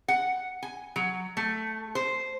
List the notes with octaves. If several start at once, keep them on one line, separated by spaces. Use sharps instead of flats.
F#5
G#5
F#3
A3
C5